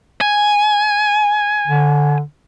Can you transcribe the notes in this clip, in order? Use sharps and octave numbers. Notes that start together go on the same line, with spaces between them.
G#5
D3